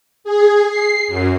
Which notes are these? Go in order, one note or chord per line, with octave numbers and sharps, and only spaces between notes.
G#4
C7
F#2